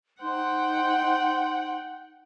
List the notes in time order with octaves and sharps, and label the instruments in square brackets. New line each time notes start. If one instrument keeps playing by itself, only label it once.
[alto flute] D#4 [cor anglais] C5 [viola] F#5 G5